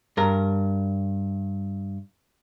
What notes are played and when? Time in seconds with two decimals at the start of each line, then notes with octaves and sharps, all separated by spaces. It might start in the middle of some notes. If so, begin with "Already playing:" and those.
0.17 G2 A#4